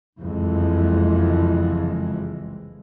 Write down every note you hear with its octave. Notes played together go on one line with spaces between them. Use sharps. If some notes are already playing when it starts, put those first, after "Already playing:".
F#1 C2 F2 E3 G#3